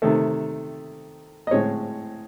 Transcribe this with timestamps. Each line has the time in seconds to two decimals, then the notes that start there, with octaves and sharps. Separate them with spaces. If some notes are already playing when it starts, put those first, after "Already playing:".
0.02 C3 D#3 A3 A4
1.47 D#5
1.51 A2 G#3 C4 C#5